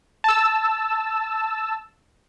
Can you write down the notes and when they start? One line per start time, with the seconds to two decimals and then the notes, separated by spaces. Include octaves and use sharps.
0.24 A5 E6